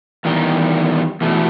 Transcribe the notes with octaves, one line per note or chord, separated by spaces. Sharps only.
E2 D#3 G3
E2 B2 A3